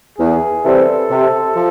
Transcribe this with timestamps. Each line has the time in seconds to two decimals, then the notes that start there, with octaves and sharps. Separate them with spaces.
0.18 E2 G#4
0.64 C3 E3 G3 C4 A4
1.11 C3
1.55 F3